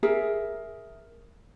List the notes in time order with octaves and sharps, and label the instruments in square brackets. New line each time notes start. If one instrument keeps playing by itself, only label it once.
[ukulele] G#4 A#4 E5